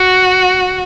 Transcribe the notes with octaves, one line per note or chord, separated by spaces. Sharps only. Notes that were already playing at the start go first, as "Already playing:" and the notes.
Already playing: F#4